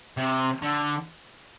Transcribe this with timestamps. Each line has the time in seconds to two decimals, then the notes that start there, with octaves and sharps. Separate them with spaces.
0.17 C3
0.62 D3